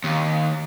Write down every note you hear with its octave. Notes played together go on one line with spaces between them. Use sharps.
D#2